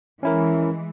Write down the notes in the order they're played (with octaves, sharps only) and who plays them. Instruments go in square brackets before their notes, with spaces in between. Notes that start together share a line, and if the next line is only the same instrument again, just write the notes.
[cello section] E3 G#3 [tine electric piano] C#4 E4 A#4